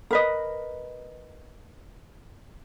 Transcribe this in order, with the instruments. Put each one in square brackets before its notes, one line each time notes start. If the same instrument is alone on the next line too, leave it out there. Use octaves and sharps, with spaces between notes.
[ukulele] A#4 B4 D#5